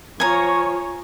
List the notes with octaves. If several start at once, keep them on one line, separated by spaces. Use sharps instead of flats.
F3 C#5 G#5 A#5